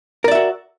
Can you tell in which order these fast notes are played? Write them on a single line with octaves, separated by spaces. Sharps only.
A#4 D5 E5 F#4